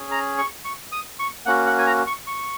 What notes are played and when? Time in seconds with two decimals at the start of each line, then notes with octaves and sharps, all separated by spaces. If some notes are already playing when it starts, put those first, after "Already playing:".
Already playing: C#4 G#4
0.11 A#5
0.38 C#6
0.65 C#6
0.92 D#6
1.19 C#6
1.46 A#3 C#4 F#4 F#5
1.66 F#5
1.78 G#5
1.86 A#5
2.07 C#6
2.27 C#6